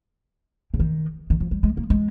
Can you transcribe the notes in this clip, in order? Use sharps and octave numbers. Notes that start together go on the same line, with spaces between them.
C#3
D#3
D#3
F3
G3
G#3
A#3
G#3